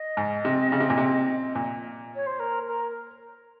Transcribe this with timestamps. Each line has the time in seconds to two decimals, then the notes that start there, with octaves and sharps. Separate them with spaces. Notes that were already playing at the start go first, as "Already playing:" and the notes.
Already playing: D#5
0.17 G#2
0.45 C3
0.72 C#3
0.80 C3
0.90 A#2
0.97 C3
1.55 A#2
2.16 C#5
2.27 C5
2.40 A#4
2.67 A#4